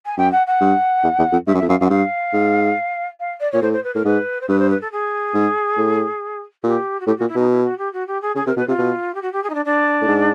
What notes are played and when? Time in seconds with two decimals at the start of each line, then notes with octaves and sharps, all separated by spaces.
0.05 G#5
0.17 F#2 G5
0.31 F#5
0.47 F#5
0.61 G2
1.03 E2
1.18 E2
1.32 F2
1.47 G2 E5
1.54 F#2
1.58 F2 E5
1.68 F#2 F5
1.80 F#2 F5
1.85 F#5
1.90 G2 F5
2.33 G#2
3.20 F5
3.40 D5
3.52 A#2 C#5
3.62 A2 C5
3.72 C5
3.84 B4
3.94 A2 A#4
4.05 G#2 B4
4.41 C5
4.48 G2 B4
4.59 C5
4.70 B4
4.81 A4
4.92 G#4
5.34 G#2
5.77 A2
6.63 A#2 G4
7.00 F#4
7.06 A2 G4
7.17 A#2 F#4
7.28 E4
7.36 B2 D#4
7.50 E4
7.63 F#4
7.78 G4
7.93 F#4
8.07 G4
8.22 G#4
8.35 C#3 G#4
8.46 C3 A#4
8.57 B2 B4
8.68 C3 F4
8.79 B2
9.14 G4
9.22 F#4
9.32 G4
9.43 G#4
9.49 D#4
9.54 D4
9.65 D4
10.01 A2
10.08 G#2